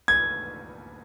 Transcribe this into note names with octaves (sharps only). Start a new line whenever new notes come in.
G#6